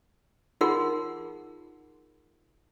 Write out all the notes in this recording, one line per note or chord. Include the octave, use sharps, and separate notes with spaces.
D#4 F4 G#4 A#4 F#5 C6